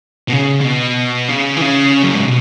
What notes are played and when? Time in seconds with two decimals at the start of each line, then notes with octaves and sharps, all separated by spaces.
0.28 B2
0.33 C#3
0.61 C#3
0.65 B2
1.29 C#3
1.57 E3
1.62 C#3
2.03 F#2
2.14 G#2
2.25 B2